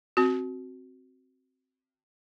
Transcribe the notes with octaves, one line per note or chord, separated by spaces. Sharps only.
C4 F#4